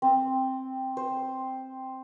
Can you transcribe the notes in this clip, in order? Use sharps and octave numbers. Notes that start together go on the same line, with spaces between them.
C4
C5